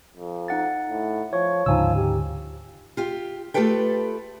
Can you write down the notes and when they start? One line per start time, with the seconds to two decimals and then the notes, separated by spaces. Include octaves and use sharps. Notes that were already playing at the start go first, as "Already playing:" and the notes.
0.17 F2
0.48 D#4 F#5 A6
0.90 A2
1.33 F3 C#5 C#6
1.66 D2 G#2 C#3 F3 D#4 G#5 E6
1.96 G4
2.97 F4 G4
3.54 A3 F4 G4 A4 B4 G5